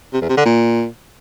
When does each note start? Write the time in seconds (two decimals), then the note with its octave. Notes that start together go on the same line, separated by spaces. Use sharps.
0.13 C3
0.21 E2
0.29 C3
0.37 D3
0.45 A#2